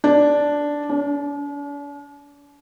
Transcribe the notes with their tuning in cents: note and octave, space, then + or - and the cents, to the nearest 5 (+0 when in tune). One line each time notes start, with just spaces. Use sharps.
D4 -5
D4 -45